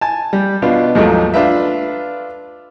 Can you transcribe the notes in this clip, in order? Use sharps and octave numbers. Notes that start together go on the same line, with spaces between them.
G#5 A5
G3
B2 B3 D4 F4
D#2 G#2 F3 F#3 A3
D4 F4 B4 E5